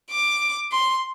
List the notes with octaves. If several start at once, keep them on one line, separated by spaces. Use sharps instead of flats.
D6
C6